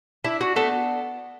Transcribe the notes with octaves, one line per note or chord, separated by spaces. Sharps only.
D4 E4
F#4
A3 B3 A4